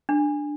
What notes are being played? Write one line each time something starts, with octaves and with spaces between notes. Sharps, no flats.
D4